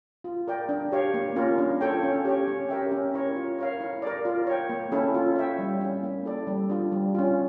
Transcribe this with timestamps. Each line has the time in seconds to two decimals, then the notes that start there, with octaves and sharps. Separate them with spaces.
0.24 F4
0.48 A#4 D5 G5
0.69 D4
0.92 G4 C#5 F5
1.14 A#3
1.36 C#4 F4 A#4
1.58 D4
1.81 F4 A4 C#5 G5
2.03 C#4
2.25 G4 C#5
2.48 C#4
2.69 G4 A#4 E5 G5
2.92 C#4
3.14 E4 A#4 C#5
3.36 F4
3.59 A#4 C#5 F5
3.81 E4
4.02 A#4 D5
4.25 F4
4.47 C#5 G5
4.69 A#3
4.92 C#4 E4 A4
5.14 F4
5.36 C#5 E5 G5
5.59 G3
5.81 C#4 E4
6.03 A#3
6.25 E4 A4 D5
6.47 G3
6.69 D4 F4
6.92 G3
7.15 C#4 F4